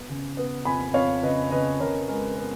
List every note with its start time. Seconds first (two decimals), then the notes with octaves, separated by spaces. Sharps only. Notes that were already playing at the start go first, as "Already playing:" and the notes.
Already playing: B3
0.09 C#3
0.37 B3
0.65 F2 G#5 B5
0.94 F2 C#5 F5
1.23 C#3 B4 D#5
1.51 C#3 B4 D#5
1.80 C#3 A#4 C#5
2.08 G#3 A#4
2.37 B3 B4